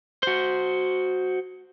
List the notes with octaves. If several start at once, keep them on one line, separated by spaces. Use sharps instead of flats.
F#4 C5